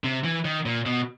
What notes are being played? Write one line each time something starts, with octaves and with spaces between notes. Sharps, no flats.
C3
E3
D#3
A#2
B2